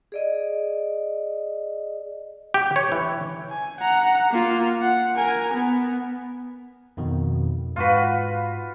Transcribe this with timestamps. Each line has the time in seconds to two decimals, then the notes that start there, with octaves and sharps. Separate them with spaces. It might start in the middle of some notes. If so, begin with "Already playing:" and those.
0.12 G#4 D5 D#5
2.54 G4
2.76 C#5
2.92 E3
3.50 G#5
3.80 F#5 A#5
4.31 A#3 F4
4.82 F#5
5.17 A#4 G#5
5.53 B3
6.97 F2 B2 D#3
7.76 G#2 F4 F#4 B4